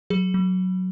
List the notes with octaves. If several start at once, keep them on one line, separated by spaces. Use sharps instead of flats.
F#3 G#4
F#3